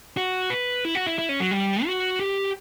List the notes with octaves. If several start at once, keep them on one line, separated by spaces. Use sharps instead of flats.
F#4
B4
E4
F#4
E4
E4
C#4
F#3
G3
F#4
G4